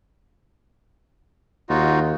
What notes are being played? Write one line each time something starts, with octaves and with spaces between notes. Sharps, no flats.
D#2 D#4 F4 F#4